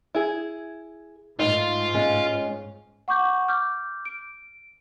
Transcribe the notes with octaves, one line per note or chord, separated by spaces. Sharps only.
E4 G#4
G#2 A3 D#4 F4
G#3 C#4
F#5 C#6 D6 G6
D6 F6 G6
D7